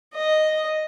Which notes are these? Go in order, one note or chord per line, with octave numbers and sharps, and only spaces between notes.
D#5